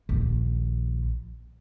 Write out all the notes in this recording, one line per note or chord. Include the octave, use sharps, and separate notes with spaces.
A#1 D#2